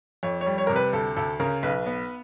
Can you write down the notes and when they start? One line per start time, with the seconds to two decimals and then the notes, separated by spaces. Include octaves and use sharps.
0.23 F2 C#5
0.41 C#5
0.46 G3
0.58 C#5
0.67 C3 A#4
0.76 B4
0.93 D2 A4
1.16 D2 A4
1.40 C#3 A#4
1.63 B1 B4
1.86 B3